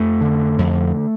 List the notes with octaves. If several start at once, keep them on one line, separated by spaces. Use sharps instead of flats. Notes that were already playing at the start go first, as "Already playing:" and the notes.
Already playing: F2 A3
D3
F2